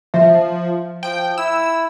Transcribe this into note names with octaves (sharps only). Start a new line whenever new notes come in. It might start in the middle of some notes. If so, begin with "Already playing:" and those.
F3 E5
F3 G5
E4 E6